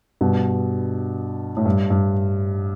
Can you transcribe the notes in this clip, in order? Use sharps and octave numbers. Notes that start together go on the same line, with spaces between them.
G2 B2
A2
G2
G2